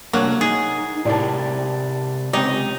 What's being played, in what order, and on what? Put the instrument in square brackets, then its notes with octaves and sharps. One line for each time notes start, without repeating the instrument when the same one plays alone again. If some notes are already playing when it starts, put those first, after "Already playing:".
[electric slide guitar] C3 G3 D4 [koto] F#3 [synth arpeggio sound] A#3 A#4 F#6
[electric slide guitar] D#4 [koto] G#4
[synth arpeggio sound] A2 [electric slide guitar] C3 G4 A#4 [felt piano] D5 A5
[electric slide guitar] C#3 G#3 [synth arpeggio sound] C4 G4 [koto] D#4 [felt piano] C#5